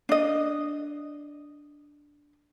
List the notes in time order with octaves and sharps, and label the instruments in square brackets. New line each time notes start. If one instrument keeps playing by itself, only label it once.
[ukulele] D4 D#5